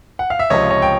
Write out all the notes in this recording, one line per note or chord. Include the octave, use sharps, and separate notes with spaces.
F#5
F5
E5
C#2 C3 F3 C#5 D#5
C#5 D#5
G5